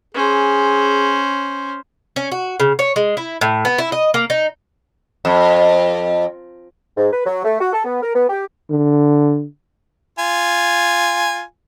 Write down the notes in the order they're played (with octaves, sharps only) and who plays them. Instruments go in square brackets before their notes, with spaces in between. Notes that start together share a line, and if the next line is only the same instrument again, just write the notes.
[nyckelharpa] C#4 C5 [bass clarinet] G#4
[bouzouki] C#4
F#4
C#3
C#5
G#3
E4
A2
B3
E4
D#5
A#3
D#4
[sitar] F2
[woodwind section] G#2
B4
F#3
A3
F#4
A4
B3
A#4
B3
G4
[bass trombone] D3
[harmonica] F4 G#5